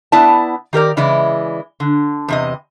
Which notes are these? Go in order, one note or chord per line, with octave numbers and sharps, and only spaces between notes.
B3 E4 D5 A5
D#3 G4 A#4 D5
C#3 E3 G#3 E4 D5
D3
E2 C3 D#5